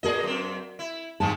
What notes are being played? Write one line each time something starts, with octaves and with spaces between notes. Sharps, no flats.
A#2 F#4 G#4 A#4 D5 D#5
F#2 C4
E4
G#2 C3 D#3 F3 G#5 A5